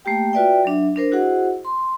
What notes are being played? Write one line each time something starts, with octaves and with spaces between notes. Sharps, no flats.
A3 A#3 G4 G5
F4 F#4 B4 D5 E5 G5
F#3 D4 E5
D4 A#4 C5
E4 F#4 G#4 C5 D#5 F#5
C6